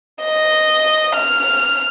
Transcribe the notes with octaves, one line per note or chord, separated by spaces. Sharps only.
D#5
F6